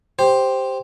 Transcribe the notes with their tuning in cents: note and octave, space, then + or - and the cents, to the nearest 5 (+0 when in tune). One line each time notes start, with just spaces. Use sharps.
G4 +0 C5 +0